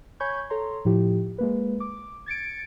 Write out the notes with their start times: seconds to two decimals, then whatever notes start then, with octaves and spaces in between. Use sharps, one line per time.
0.20 C#5 G#5 B5 C#6 G6 G#6
0.50 A4 C#5 A#5 C6
0.85 A2 F3 E4 G4
1.38 G#3 A#3 B4
1.80 D6
2.26 G#6 A6 C#7 D7